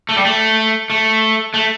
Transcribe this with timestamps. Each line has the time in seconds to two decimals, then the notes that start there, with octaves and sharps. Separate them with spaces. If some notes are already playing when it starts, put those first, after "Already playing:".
0.09 A3
0.16 G3
0.25 A3
0.90 A3
1.54 A3